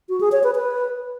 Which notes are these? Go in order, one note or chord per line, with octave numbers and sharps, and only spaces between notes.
F#4
G#4
C#5
B4
B4